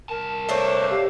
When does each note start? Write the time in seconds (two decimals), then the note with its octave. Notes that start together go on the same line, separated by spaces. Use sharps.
0.09 C2 A#4 A5
0.49 A3 A#3 D4 C5 C#5
0.90 G4 F5